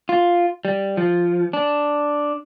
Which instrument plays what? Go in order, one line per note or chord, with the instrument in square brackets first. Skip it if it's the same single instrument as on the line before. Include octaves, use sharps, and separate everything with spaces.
[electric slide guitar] F4
G3
F3
D4